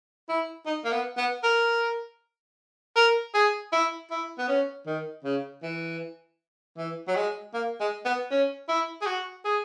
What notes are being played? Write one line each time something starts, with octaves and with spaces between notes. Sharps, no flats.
E4
D#4
A#3
B3
B3
A#4
A#4
G#4
E4
E4
B3
C#4
D#3
C#3
E3
E3
F#3
G#3
A#3
G#3
B3
C#4
E4
G#4
F#4
G#4